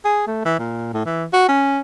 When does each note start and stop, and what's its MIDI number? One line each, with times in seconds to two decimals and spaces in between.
0.05 0.22 68
0.27 0.44 57
0.45 0.56 52
0.59 0.91 46
0.93 1.05 45
1.06 1.25 52
1.33 1.48 66
1.48 1.80 61